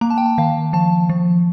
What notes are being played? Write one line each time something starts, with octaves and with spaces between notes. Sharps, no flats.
A#3 A#5
A5
G5
A5
D#3 F5
F3 A5
F3